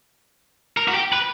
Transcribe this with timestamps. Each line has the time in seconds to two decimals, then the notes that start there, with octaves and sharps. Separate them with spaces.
0.77 A#4
0.88 F#4
0.95 G4
1.12 B4